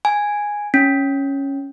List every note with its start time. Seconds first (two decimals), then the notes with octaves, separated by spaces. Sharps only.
0.05 G#5
0.74 C#4